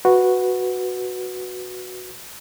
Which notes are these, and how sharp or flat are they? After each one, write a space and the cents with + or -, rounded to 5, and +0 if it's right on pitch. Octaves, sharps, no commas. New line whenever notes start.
F#4 -5 B4 +0